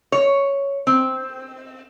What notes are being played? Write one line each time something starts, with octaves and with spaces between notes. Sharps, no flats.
C#5
C4